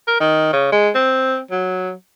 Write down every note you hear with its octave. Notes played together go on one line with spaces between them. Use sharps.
A#4
D#3
C#3
G#3
C4
F#3